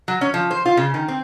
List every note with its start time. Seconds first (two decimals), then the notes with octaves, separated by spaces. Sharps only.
0.08 F#3
0.21 C#4
0.34 F3
0.51 C5
0.65 F4
0.77 C#3
0.94 D#3
1.08 C4